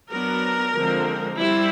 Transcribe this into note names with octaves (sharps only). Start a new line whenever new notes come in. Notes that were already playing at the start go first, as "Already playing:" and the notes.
F#3 B3 D4 A#4
D3 F3 G#3 C4
G3 C4 E4